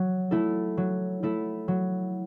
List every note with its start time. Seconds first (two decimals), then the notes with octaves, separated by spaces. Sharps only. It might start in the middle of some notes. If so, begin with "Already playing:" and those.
Already playing: F#3
0.31 A3 E4 A4
0.77 F#3
1.23 A3 E4 A4
1.68 F#3